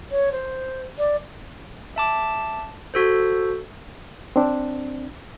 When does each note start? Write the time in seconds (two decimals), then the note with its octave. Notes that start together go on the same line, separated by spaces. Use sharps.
0.11 C#5
0.32 C5
0.98 D5
1.96 E5 A5 D6
2.94 F#4 A4 C5
4.36 C4 D4